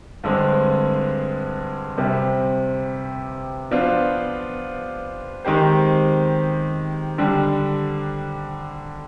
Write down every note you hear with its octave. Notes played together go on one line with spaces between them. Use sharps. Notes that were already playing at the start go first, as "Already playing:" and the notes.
G2 D3 G#3 C4
C3 G3 C4 G4
F3 B3 D4 F4 C5
D#3 G#3 C4 G4 C5
D3 G3 D4